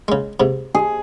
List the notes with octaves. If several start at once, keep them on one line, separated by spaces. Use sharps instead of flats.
C#3 G#3
G#2 C3
G#4